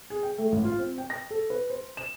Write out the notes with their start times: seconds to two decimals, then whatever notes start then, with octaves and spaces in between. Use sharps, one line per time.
0.10 G#4
0.23 G5
0.38 A3
0.52 A1
0.64 F4
0.78 C4
0.98 G5
1.10 A#6
1.31 A4
1.50 B4
1.70 C5
1.97 E7